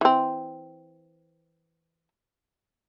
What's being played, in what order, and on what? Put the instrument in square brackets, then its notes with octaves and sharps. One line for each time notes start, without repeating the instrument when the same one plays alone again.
[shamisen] E3 C4